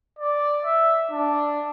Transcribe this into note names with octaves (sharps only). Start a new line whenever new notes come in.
D5
E5
D4